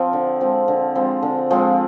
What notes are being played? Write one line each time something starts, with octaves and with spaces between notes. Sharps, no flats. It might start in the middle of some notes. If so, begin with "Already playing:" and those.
Already playing: F3 C4
D3
F3 G#3 C4
D3
F3 G#3 C4
D3
F3 G#3 C4